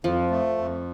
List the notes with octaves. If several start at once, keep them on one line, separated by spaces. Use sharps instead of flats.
F2 F3
A3
F2